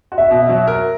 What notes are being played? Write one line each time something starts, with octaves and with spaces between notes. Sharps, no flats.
F#4
E5
B2
E5
F#3
A#4